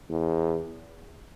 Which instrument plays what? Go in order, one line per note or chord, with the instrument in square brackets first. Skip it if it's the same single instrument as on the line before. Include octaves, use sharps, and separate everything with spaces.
[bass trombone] E2